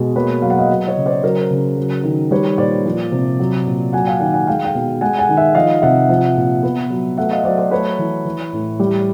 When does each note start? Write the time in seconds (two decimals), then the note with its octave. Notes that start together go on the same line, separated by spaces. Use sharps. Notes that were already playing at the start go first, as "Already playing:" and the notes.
Already playing: B2 G#3
0.16 A#3 B4 C#5
0.42 F#3 F5
0.50 F#5
0.59 D#5 F5
0.69 F#3
0.87 C#5 D#5
0.96 C#3
1.06 C5 D5
1.23 F#3 A#4 C5
1.50 C#3
1.77 F#3
2.04 D#3
2.31 G3 B4 C#5
2.58 A#2 C5 D5
2.86 F3
3.12 C3
3.40 F#3
3.67 A#2
3.93 F#3 F#5 G#5
4.06 F5 G5
4.20 D#3 F#5 G#5
4.33 F#5 G#5
4.47 G#3 F5 G5
4.65 F5 G5
4.75 B2
5.01 G#3 F#5 G#5
5.19 F#5 G#5
5.29 D#3
5.37 E5 F#5
5.55 F3 D#5 F5
5.82 C3 E5 F#5
6.09 F3
6.37 A#2
6.63 B3
6.90 F#3
7.18 A3 E5 F#5
7.31 D#5 F5
7.44 F#3 C5 D5
7.58 C5 D5
7.71 A3 B4 C#5
7.99 E3
8.25 E3
8.53 A2
8.80 G3